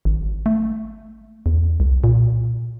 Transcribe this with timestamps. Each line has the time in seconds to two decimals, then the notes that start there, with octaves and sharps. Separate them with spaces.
0.05 G#1
0.46 A3
1.46 E2
1.80 C2
2.04 A#2